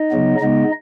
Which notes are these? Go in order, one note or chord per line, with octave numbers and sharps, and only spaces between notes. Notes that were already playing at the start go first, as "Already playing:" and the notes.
Already playing: D#4 D#5
C#3 F#3 B3
C#3 G#3 B3 D#4 D#5